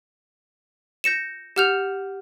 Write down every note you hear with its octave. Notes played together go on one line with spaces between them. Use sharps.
G6 A#6 C#7 E7
G4 F#5 F6 G6 F7